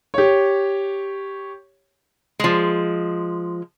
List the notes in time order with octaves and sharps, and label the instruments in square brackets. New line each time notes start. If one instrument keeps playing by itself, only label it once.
[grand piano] G4 C#5
[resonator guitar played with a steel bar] F3 G#3